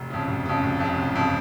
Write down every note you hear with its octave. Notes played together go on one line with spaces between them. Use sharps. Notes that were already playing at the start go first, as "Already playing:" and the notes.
Already playing: F1
F2 C#3
F1
F2 C#3
F1
F2 C#3
F1
F2 C#3